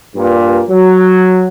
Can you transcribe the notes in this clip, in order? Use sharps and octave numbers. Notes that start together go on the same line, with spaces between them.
G2 A#2
F#3